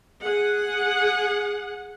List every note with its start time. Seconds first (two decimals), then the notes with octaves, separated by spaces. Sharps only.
0.23 G#4 F#5